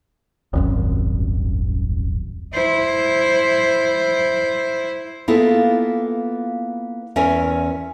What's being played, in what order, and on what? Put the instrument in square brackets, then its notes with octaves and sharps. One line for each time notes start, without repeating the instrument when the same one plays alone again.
[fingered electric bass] D#1 G#1 F#2
[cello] E4 C5
[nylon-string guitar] A#3 B3 E4 F4 G#4 A4
E2 C#4 A#4 E5 G#5